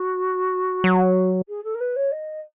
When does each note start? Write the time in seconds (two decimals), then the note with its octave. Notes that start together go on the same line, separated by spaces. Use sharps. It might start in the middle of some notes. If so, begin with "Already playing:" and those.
Already playing: F#4
0.84 F#3
1.48 G#4
1.64 A4
1.74 A#4
1.80 B4
1.96 C#5
2.12 D#5